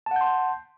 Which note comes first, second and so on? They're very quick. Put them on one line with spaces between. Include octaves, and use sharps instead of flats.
A5 F#5 G6 C6